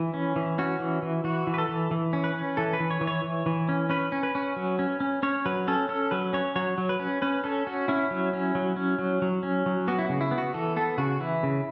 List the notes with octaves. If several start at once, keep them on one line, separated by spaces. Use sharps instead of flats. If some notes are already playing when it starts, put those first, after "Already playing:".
Already playing: E3 E4
C#4
E3
C#4 F#4
E3
E3
E3 F#4
E3
B4
A4
E3
E3
C#4
B4
C#4
E3 A4
B4
E3
C#5
E3
C#5
E3
E3
C#4
C#4 B4
C#4
B4
C#4
F#3
C#4
C#4
C#4 C#5
F#3 B4
C#4 A4
C#4 A4
F#3 B4
C#4 C#5
F#3 C#5
F#3
B4
C#4
C#4 B4
C#4 A4
C#4 F#4
C#4 E4
F#3
C#4
F#3
C#4
F#3
F#3
C#4
F#3
B3 F#4
E4
C#3 F#4
E4
B3
F#4
E3 A4
B3 A4
C#3 F#4
E3 E4
C#3